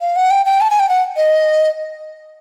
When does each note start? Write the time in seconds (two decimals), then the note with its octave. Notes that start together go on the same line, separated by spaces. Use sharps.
0.01 F5
0.16 F#5
0.31 G5
0.46 G5
0.61 A5
0.71 G#5
0.80 G5
0.89 F#5
1.17 D#5